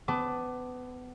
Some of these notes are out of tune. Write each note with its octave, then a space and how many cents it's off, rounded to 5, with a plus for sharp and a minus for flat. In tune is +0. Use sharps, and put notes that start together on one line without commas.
B3 +25 A5 +0 D6 +10